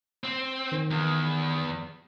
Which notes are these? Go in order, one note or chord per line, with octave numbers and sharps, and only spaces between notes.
C4
D#3
E2